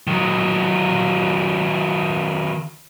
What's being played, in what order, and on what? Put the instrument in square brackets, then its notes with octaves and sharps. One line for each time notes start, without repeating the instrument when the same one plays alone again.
[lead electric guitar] D#3 F#3